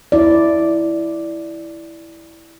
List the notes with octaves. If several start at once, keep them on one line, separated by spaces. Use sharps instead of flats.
E4 D5